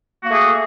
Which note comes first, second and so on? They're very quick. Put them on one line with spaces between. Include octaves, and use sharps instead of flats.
F#4 A#3 A3 G#4